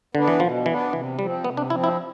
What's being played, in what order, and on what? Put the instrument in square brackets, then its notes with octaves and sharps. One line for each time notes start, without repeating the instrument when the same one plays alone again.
[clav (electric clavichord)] D3 [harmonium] B3 D4
[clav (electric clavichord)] E3
[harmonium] B2 [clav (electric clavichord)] F3
[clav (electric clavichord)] E3 [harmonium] B3 D4
[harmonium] C3 [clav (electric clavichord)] E3
[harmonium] F3 [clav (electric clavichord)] G3
[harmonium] C4
[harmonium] C3 [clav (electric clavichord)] B3
[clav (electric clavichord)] D4
[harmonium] F3 C4 [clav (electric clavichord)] E4
[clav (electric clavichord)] E4